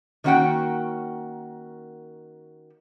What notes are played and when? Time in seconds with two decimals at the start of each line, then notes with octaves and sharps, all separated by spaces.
0.24 D#3 A#3 C#4 F#4 F#5 G5